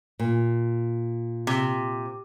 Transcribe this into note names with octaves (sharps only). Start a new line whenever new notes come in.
A#2
C3